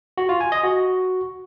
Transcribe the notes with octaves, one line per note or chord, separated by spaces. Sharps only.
F#4
F4
G#5
D#5
F#4